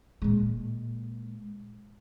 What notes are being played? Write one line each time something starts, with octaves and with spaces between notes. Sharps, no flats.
A#2 G#3